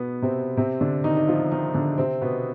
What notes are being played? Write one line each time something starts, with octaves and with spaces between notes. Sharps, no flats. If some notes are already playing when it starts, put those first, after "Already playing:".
Already playing: B2 B3
C3 C4
C3 C4
D3 D4
D#3 D#4
D#4
F3 F4
D#3 D#4
D3 D4
C3 C4
B2 B3